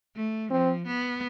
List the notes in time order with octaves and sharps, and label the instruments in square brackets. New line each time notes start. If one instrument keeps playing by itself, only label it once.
[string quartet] A3
[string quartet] F3 [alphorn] C4
[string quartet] B3